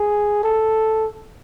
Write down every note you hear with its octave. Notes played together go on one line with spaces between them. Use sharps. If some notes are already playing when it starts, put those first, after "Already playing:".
Already playing: G#4
A4